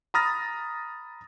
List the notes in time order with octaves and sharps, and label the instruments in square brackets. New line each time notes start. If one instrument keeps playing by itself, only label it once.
[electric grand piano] A#5 B5 D#6 F6 A6 A#6